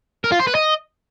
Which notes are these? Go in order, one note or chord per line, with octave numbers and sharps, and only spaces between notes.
A#4
F4
C5
B4
D#5